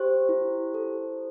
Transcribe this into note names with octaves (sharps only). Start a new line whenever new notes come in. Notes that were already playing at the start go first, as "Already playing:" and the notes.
Already playing: G4 C5
E4
A4